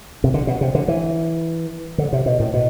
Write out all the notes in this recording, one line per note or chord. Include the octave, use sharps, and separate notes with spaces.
C3
D3
B2
C3
D3
E3
D3
C3
B2
A2
B2